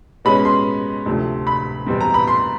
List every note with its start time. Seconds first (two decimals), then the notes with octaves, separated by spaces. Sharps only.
0.25 B2 G#3 C#4 B5
0.45 C6
1.06 D2 C3 F3 A3
1.47 B5
1.86 E2 B2 G3 C4
2.00 A#5
2.14 B5
2.27 C6